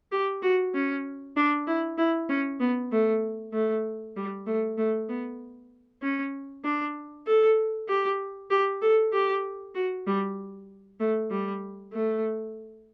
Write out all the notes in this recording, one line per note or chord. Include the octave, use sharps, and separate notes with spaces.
G4
F#4
C#4
D4
E4
E4
C#4
B3
A3
A3
G3
A3
A3
B3
C#4
D4
A4
G4
G4
A4
G4
F#4
G3
A3
G3
A3